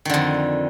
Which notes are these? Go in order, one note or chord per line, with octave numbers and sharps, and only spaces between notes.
F2 D3 D#3